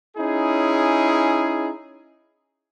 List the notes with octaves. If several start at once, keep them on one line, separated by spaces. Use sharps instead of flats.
C#4 D#4 E4 G#4